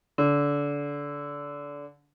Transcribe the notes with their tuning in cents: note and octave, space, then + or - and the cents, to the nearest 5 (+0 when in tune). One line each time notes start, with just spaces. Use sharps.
D3 -25